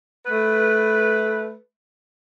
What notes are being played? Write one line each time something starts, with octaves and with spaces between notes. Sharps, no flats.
A3 B4